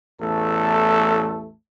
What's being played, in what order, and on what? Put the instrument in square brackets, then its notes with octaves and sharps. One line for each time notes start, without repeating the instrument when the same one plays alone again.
[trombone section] A1 E2 A3 A4